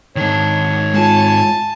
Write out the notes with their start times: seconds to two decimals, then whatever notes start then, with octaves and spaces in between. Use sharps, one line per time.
0.16 G#2 D#3 D4 C#5
0.94 G#3 F4 G#5 A5